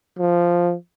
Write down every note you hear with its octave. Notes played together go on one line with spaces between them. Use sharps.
F3